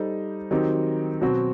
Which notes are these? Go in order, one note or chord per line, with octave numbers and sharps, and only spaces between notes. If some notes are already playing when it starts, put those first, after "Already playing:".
Already playing: G3 D#4 A4 C5
D#3 F#3 C4 D#4 G4
B2 F#3 C4 F#4